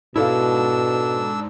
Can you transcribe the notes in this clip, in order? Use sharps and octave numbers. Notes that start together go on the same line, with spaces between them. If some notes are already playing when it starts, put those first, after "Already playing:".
G#2 B2 D4 E4 A4 F5 E6